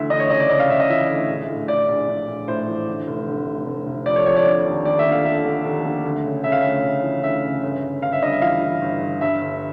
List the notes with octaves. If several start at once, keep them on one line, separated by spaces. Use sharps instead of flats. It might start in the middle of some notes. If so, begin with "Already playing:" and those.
Already playing: D2 E3 E5
D2 D#5
C#5
C#3 D#5
D5
C#3 D#5
F5
C#3 E5
D#5
E3 E5
D2
A#1
A2
A2 D5
A#1
A#1
A#1
A2 C5
E3
D3
F1
D3
F1
F1
F1
F2 D5
C#5
F2 C#5
D5
D3
D#2
D#2 D5
E5
D3
F5
D3 E5
D3
D#2
D3
D2
C#3
C#3 E5
F5
D2 E5
C#3
E3
D2 E5
C#3
G1
G1
G1 F5
E5
G2 D#5
E5
E3 F5
E3
G1
G2
G2 E5
G1